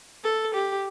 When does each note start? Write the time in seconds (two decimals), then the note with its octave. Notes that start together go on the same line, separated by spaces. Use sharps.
0.24 A4
0.54 G4